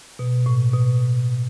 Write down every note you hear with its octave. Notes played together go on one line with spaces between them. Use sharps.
B2
A2
B2